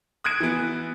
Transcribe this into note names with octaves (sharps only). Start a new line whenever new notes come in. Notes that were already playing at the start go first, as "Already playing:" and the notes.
D#6 F#6 G#6 D7
E3 B3